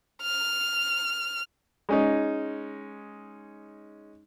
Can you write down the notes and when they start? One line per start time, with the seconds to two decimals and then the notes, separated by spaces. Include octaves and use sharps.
0.22 F6
1.89 G#3 C#4 D#4